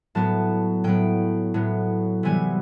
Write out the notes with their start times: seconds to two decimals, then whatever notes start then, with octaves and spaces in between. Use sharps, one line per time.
0.15 A2 F#3 B3 A5
0.84 A2 F#3 B3 G5
1.54 A2 F#3 B3
2.23 C3 E3 G3 B3 G#5